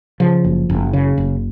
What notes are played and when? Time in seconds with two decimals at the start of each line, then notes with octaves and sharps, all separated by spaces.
0.20 C#3 F3
0.44 F#1
0.70 F#1
0.93 C#3
1.18 F#1